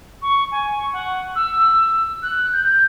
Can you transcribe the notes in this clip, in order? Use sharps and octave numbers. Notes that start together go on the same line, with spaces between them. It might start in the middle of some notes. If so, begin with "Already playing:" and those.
C#6
G#5
C#6
F#5
E6
F#6
G6